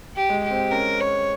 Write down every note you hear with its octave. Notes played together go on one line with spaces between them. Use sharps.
G4
G#3
G4
C4
C#4 A#4
C#5